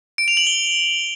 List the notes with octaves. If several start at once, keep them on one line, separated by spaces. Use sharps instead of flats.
D7
F7
F#7
G7